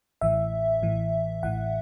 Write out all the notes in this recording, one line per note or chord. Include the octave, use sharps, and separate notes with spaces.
A1 A2 E3 E5
A1 A2 E3
A1 A2 E3 F#5